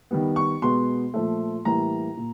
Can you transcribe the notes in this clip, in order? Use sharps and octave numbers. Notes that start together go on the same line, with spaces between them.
D#3 G3 B3
C#6
B2 G#3 B3 C6
A#2 F3 A3
A2 E3 G3 A#3 A#5
A#2